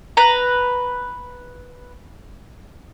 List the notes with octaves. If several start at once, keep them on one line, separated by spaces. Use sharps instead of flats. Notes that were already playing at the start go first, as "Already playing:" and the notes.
B4 A#5